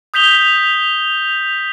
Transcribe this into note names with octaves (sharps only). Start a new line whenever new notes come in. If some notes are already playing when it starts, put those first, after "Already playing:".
D#6 G6 B6 F7 G7